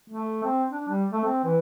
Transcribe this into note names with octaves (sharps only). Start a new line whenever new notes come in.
A3
C4
D4
G3
A3
C4
E3